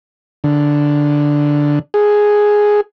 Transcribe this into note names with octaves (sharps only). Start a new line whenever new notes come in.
D3
G#4